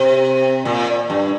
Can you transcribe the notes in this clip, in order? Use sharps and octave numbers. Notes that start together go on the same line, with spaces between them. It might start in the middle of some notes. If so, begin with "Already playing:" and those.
Already playing: C3
A#2
G2